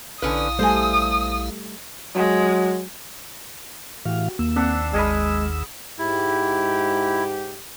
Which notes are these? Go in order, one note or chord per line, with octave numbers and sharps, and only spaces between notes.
A#1 D3 C#4 E4 B4 F5 D#6
G3 A3 A4 C5 G#5
F#3 G#3
A2 E3 F#4 G4 F5
D#2 A#3 E6
A#3 C4 D4 E5 F#5 C7
G#1 G#3 G#4 D#5 B5 F6
G#2 E4 G4